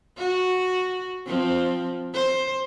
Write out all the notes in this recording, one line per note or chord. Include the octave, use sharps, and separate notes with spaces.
F#4
F3 C4
C5